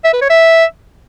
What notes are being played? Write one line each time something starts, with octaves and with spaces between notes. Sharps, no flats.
E5
B4
C#5
E5